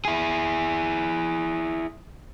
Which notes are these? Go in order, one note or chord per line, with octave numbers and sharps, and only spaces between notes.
E4 G#4